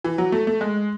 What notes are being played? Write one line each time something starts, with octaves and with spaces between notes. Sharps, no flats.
E3
F#3
A3
A3
G#3